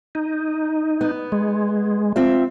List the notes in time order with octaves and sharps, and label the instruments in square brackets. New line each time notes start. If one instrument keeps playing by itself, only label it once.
[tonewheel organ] D#4
[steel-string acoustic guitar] B3
[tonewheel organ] G#3
[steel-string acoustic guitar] C4 F4 E5